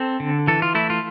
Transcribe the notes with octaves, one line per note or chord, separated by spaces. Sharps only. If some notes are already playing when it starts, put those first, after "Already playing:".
Already playing: C4 A4
D3
E3 A4
F4
A3 E4
F4